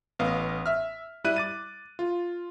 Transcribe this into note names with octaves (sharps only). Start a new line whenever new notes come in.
A1 B3 D#5 F5
E5 F6
G3 E4 F#6 D#7
D6 A6 D#7
F4